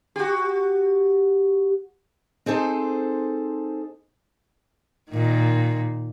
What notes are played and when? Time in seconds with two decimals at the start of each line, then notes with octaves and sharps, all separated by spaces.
0.16 F#4 G4
2.46 C4 D#4 G#4 A4 C5
5.12 A#2 D#3